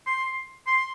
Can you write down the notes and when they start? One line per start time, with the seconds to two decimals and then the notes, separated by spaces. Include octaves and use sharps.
0.06 C6
0.67 C6